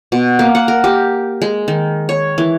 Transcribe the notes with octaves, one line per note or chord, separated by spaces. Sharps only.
B2
A#3
F#5
A#4
G4
G#3
D#3
C#5
E3